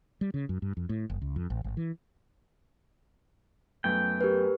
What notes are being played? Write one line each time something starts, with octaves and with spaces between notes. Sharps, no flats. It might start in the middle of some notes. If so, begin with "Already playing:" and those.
G3
C#3
F#2
G2
F2
A2
F#1
C#2
F2
A1
G#1
E3
F#2 A3 B3 G5
G4 A#4 B4